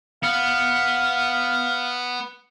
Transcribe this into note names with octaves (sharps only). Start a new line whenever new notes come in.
B3 F5